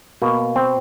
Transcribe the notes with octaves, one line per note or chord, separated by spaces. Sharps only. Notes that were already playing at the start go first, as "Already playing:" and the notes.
B2 A#3
C4